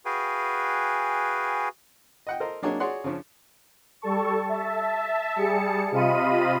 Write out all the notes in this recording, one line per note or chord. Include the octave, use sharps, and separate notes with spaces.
F#4 G#4 B4 F5 G5 G#5
D#5 F#5 G5
A4 A#4 C5 D#5
F#3 A#3 D4 G#4 C#5 D#5
F#4 G#4 C#5 D5 F#5 C6
C#3 F3 C#4 D4
G3 A4 A5 C#6
E5 A5
G3 G#4 A5 C#7
C3 F4 D#5 F5 B5 D#7